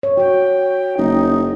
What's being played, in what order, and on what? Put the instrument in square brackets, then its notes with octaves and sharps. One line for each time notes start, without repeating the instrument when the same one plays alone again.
[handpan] C#5
[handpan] F#4 C#5 [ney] G5
[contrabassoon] F#1 [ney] D#4